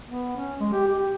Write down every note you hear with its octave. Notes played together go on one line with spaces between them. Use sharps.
B3
C#4
G#3
G4
G4
G4